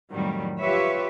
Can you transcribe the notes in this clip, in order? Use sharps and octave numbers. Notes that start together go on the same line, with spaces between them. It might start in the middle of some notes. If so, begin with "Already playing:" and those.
F2 A2 D#3 F#3 G3
F4 G4 B4 C#5 E5